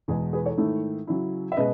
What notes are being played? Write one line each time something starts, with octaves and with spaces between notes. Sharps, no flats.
E2 B2 G#3 G#4
G#4 B4
A4 C#5
G#2 D#3 A3 E4
C#3 F#3 C#4 E4
E5
B2 G#3 C#4 B4 D#5